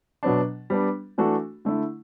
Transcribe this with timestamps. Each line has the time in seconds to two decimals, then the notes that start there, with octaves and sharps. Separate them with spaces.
0.23 B2 F#3 B3 D4
0.70 G3 B3 D4
1.18 E3 A3 D4 F#4 A4
1.65 D3 A3 E4